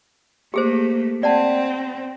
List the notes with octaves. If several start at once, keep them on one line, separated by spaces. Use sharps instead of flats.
A3 A#3 G4 G#4 C5
C4 D5 F#5 A5